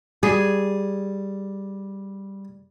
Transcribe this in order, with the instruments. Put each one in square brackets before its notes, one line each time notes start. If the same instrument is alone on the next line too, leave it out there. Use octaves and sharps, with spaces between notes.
[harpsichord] G3 [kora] G#4